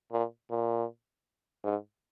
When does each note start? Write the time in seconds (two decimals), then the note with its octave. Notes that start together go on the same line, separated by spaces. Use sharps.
0.12 A#2
0.50 A#2
1.64 G#2